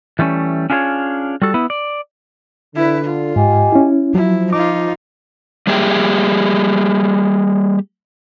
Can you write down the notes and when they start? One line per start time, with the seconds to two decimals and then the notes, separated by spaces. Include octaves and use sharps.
0.19 E3 G3 A3 C#4
0.70 C#4 D4 F4 G#4 B4 C#5
1.42 G3 F#4 A4
1.54 B3 E4
1.70 D5
2.76 D3 E4 B4
3.04 F4
3.36 G#2 G4 D#5 G#5
3.72 C#4 E4
4.15 F3 F#3 E4
4.53 D#4 F4 D6
5.67 G3 A#3 G4 G#4 E5 G5